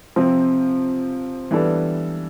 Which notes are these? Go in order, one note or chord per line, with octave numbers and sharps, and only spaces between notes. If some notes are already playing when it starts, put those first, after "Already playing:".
C3 F3 C4
E3 G3 B3 D4 A4